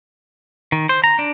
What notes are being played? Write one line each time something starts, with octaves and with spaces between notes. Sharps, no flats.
D#3
C5
A#5
D4